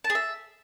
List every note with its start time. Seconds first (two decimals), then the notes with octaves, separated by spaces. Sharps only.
0.04 A5
0.10 G#4
0.15 E5